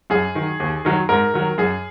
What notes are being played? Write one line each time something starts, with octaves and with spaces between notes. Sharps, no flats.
F#2 G#4
D#3 F#3
D#2
D#3 F#3
G#2 A#4
D#3 F#3
F#2 G#4